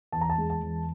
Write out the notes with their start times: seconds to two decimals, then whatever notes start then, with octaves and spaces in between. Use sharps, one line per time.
0.12 E2 A5
0.21 A#5
0.29 A5
0.38 G#3
0.50 A5
0.62 E2